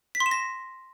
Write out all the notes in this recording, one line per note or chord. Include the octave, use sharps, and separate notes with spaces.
B6
C6
E7
A#6